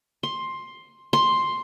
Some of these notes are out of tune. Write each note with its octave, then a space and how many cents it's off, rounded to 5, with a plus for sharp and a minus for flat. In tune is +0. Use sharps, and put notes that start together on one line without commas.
C6 +10
C6 +5